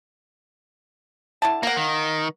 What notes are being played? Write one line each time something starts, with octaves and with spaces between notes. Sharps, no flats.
D3 E4 A5
A#3 F5 F#5
D#3